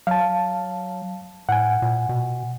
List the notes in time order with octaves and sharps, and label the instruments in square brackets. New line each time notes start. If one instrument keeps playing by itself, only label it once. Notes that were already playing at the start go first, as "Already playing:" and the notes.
[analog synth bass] F#3 [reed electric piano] F5 A5
[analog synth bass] A2 [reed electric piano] F#5 G#5
[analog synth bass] A#2
B2